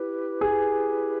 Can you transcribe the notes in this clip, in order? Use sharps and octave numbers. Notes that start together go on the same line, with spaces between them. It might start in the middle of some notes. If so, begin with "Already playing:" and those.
Already playing: E4 G4 B4
G#4